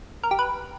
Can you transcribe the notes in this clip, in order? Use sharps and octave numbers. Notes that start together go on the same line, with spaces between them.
A#4
G4
B4